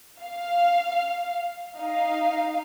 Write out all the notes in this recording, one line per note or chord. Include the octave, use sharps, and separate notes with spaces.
F5
D#4 F5